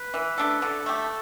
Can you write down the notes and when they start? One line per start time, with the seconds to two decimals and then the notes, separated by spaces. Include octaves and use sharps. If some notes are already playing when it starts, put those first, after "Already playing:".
Already playing: B4
0.14 E3
0.38 A3 D4 A4
0.62 D3 A4
0.86 A3 G4